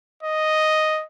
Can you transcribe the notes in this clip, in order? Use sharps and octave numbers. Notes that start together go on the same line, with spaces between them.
D#5